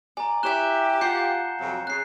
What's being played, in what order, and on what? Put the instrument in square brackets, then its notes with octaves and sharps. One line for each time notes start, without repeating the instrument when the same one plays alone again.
[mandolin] D5 [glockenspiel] G#5 A#5
[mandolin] E4 C#5 E5 [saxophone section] G4 [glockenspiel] F#6 E7 G7
[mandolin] F4 F#5 A5 [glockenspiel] G6 C7 C#7
[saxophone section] F2 C3 F#3
[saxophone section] C#3 [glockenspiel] F#6 C7